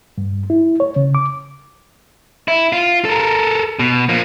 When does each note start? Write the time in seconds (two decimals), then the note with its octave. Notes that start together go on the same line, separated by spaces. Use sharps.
0.18 G2
0.50 E4
0.80 C#5
0.96 C#3
1.15 D6
2.48 E4
2.73 F4
3.05 A4 A#4
3.79 B2
4.09 F3 A#3